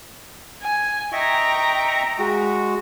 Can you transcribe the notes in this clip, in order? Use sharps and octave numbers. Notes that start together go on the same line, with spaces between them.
G#5
D#5 E5 G5 A#5 C#6
G#3 F#4